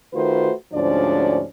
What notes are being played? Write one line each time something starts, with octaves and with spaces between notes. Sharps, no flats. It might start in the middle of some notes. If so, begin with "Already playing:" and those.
D#3 A3 F4 F#4 B4 C5
D2 G#2 F3 C#4 D4 D5